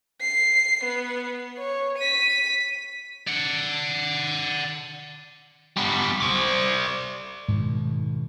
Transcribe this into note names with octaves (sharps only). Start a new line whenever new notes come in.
C7
B3
C#5
B6 D#7
D5 F#5
G3 B3
C5 D5
G#2 B2 D#3